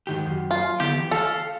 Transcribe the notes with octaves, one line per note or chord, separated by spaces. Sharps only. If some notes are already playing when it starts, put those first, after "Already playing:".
G#2 D#3 G4
F#2
F4
D3 B3 E4 G4
E3
A4 F5